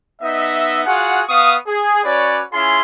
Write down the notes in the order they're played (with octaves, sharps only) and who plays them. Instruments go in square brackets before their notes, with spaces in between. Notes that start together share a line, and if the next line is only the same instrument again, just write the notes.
[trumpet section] B3 D#4 D#5 E5
F4 F#4 G#4 F#5
B3 F5 C#6 D#6
G#4
C#4 F#4 B4 C#5 D5
C#4 E4 F4 G#4 F5 C6